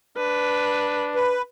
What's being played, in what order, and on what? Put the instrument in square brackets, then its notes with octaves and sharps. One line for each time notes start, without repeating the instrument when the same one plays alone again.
[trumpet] D4 [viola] B4
[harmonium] B4